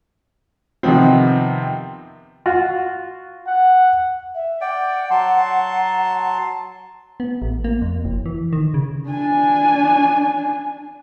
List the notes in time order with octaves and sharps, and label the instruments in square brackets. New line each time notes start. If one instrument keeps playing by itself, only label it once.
[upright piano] C3 D#3 F3 B3 C4
[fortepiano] F4 F#4
[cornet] F#5
[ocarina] E5
[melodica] D5 G5 [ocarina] F#5
[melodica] F#3 A5 C6
[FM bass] B3
A1
A#3
F2
F#1
E3
D#3
C#3
[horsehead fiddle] D4 G#5